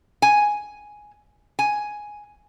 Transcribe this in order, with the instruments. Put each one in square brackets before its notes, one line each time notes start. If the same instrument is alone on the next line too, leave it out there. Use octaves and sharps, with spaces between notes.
[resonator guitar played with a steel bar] G#5
G#5